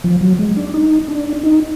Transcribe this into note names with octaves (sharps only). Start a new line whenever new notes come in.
F3
F#3
G#3
D4
D#4
D4
D#4